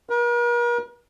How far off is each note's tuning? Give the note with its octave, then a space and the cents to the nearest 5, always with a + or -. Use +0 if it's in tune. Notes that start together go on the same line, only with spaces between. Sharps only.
A#4 +45